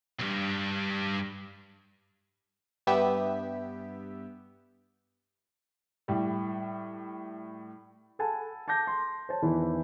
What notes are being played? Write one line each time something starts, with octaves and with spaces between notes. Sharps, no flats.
B1 G2
G2 B3 G4 E5
A2 G3
A4 F#5 G#5 A5 B5
A5 D6 G6 A#6
C6
C5 C#5 A5
E2 D#3 E3 E4